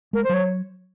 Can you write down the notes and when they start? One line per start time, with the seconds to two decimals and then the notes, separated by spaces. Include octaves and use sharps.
0.13 G#3 A#4
0.24 C5
0.29 F#3 C#5